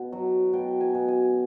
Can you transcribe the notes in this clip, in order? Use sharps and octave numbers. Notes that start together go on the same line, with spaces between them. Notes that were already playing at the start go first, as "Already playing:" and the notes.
Already playing: B2 F#5
F#3
B2 G5
G#5
B2
G#5